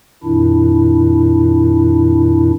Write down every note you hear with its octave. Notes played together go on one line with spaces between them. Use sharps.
F2 A#2 D#3 D4 E4